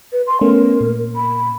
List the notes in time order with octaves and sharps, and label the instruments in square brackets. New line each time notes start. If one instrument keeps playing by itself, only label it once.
[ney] B4
C6
[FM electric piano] A3 B3 C#4 [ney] A#4
[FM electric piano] A#2
[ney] B5